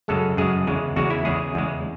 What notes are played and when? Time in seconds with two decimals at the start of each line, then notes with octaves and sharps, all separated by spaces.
0.08 F#2 C#3 G#3 A4
0.37 F#2 C#3 G#3 G#4
0.67 E2 C#3 G#3
0.96 E2 C#3 G#3 F#4
1.10 E4
1.25 E2 C#3 G#3 G#4
1.55 E2 C#3 G#3